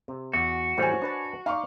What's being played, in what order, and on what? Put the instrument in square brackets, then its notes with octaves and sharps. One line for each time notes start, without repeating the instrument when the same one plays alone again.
[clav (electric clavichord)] C3
[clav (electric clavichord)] E2 [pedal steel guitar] F#4
[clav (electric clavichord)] A2 E3 G3 [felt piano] C5 C#5 G#5
[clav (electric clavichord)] D4 B4 A5
[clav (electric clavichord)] D#4 D5 [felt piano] F5 C6 C#6